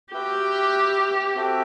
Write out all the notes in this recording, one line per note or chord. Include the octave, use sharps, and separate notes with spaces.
F#4 G4 B4 E5 G5
C4 F#4 A4 E5 G5